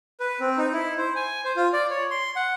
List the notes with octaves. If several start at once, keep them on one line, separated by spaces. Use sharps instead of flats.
B4
C4
D#4
E4
C5
G#5
C5
F4
D5
C#5
C6
F#5